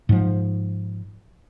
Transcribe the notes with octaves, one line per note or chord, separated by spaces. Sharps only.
G#2 F3